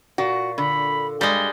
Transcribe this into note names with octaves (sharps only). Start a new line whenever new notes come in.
A#2 F#4
D3 B5
G2 G3 G#3 G7